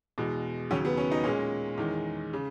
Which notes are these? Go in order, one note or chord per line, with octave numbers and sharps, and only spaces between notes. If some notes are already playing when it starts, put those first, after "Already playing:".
E2 B2 G#3
D#2 C#3 F#3 C#4
B3
C#4
D#4
A#2 G#3 C#4
E2 D#3 G#3
C#3